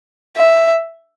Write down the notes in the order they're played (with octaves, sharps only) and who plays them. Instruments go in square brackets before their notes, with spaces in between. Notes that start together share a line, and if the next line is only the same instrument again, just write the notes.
[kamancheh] E5